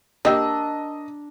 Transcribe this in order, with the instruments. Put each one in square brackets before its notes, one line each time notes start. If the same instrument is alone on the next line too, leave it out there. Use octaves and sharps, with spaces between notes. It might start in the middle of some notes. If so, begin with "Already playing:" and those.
[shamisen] A#3 G4 [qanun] D4 [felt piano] D#5 [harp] A#5 E6